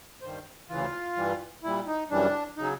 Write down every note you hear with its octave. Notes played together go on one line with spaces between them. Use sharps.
G2 D#3 G3 C5
D2 C#3 E3 F4
G2 E3 G3
A#2 G3 E4
D#4
F#2 C#3 E3 G3 D4
C#3 F#3 D#4